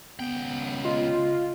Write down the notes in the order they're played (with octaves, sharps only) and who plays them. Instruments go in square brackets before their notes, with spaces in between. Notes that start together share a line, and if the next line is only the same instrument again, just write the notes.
[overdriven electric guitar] C#2 G5 [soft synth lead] B3
[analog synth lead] F4 [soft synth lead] D#5